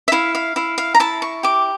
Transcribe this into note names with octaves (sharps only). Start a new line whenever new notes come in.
E5
E4 F5
F5
E4 F5
F5
A#5
E4 A5
C#6
G4 D6